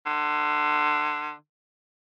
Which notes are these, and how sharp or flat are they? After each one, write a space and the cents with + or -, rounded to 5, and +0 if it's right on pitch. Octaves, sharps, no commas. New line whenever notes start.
D3 +25